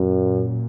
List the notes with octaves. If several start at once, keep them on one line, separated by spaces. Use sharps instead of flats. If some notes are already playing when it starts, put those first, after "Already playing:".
Already playing: F#2 A#2